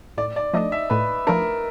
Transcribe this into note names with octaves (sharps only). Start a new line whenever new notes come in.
A2 D5
D5
F3 A3 D4 D#5
E5
A2 B4
F3 A3 D4 A#4